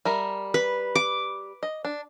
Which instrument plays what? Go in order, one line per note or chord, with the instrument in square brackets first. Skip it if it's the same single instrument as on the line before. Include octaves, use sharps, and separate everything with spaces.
[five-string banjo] G3 A#4 E5
[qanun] B4
D6
[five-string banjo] D#5
D4